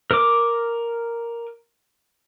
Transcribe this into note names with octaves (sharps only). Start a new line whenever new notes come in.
A#4 D6